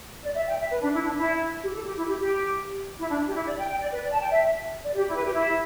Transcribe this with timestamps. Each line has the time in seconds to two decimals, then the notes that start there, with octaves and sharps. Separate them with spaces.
0.24 D5
0.35 E5
0.47 G5
0.59 E5
0.71 B4
0.82 D4
0.93 E4
1.05 D4
1.17 E4
1.62 G4
1.74 A4
1.86 G4
1.97 E4
2.08 G4
2.20 G4
3.00 E4
3.10 D4
3.26 G4
3.35 E4
3.46 D5
3.58 G5
3.69 G5
3.80 D5
3.92 B4
4.03 D5
4.13 A5
4.21 G5
4.30 E5
4.85 D5
4.96 G4
5.08 E4
5.16 B4
5.24 G4
5.34 E4